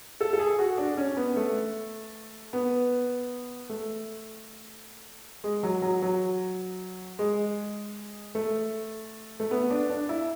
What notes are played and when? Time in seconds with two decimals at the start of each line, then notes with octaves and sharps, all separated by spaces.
0.21 A4
0.33 A4
0.39 G#4
0.59 F#4
0.78 D4
0.97 C#4
1.17 B3
1.36 A3
2.53 B3
3.69 A3
5.44 G#3
5.63 F#3
5.82 F#3
6.02 F#3
7.19 G#3
8.35 A3
9.40 A3
9.51 B3
9.70 D4
9.90 D4
10.09 E4